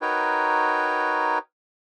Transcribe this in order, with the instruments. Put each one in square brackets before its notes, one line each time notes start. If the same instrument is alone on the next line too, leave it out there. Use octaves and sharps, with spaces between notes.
[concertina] D#4 F#4 A#4 B4 C#5 G5